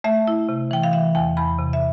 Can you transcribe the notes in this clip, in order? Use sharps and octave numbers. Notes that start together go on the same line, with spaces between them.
A3 E5
E4
C3
E3 G5
F5
E3 E5
E2 G5
E2 B5
C3
E5